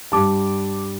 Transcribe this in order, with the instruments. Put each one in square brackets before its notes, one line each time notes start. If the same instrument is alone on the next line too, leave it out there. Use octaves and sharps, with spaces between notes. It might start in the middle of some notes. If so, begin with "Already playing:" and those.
[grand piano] G2 G3 A5 D6